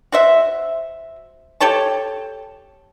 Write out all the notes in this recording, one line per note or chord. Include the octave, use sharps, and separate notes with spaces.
F#4 C5 E5
G4 A4 C#5 A5